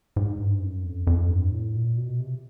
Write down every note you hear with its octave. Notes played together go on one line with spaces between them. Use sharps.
G#2
G2
F#2
F2
F2
G2
A2
A#2
B2
C3